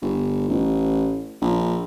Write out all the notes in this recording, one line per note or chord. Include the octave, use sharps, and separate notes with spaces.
G1
A1
A#1